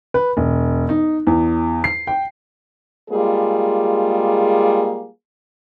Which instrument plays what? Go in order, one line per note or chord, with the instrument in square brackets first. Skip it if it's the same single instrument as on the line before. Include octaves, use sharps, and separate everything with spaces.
[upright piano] B4
E1
D#4
E2
C7
G5
[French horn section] G3 G#3 A#3 F4 G#4